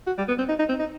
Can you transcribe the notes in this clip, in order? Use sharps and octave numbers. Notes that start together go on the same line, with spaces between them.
F#4
G3
B3
C4
D#4
D#4
C4
D#4